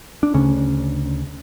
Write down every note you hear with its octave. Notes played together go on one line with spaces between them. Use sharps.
D4
D2 C#3 C#4